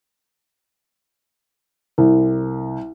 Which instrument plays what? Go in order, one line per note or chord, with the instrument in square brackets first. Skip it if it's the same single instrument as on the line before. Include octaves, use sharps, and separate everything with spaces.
[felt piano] C2